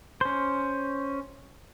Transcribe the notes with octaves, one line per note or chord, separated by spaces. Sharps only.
C#4 C5